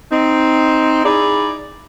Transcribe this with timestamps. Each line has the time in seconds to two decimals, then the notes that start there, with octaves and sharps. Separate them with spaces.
0.12 C4 D#4
1.05 D#4 E4 G#4 D5